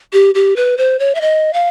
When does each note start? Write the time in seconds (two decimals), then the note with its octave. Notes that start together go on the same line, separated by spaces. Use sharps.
0.13 G4
0.35 G4
0.56 B4
0.78 C5
0.99 C#5
1.15 E5
1.21 D#5
1.53 F5